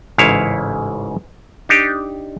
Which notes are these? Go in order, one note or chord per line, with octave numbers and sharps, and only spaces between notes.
A1 G#2 C#3 E4 C#5 F5
D4 D#4 G4